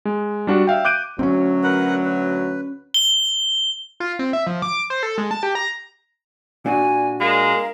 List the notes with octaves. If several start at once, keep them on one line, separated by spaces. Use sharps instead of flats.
G#3
G3 D4 F#4 D5
E5 F5 G5
D6 F#6 G6 D7 D#7
D2 F#3 C4 C#4
A#4 B4 F#5
B4
G7
F4
C4
E5
F3
D6
C5
A4
G#3
A5
G4
A#5
A#2 D4 F#4 G#5
G#3 A#4 F5